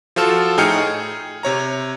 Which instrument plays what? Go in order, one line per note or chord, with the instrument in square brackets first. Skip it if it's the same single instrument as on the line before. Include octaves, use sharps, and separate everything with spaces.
[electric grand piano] F3 F4 F#4 A4 F6 E7
A2 D#4 G#4 G5 F6 C#7
G#4
C3 C#5 A#5